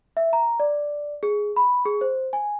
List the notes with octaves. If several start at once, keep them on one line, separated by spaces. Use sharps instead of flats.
E5
A#5
D5
G#4
B5
G#4
C5
G#5